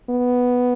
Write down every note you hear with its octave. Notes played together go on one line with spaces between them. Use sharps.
B3